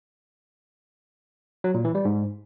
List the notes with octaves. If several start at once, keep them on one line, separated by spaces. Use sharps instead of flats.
F#3
A#2
E3
G3
G#2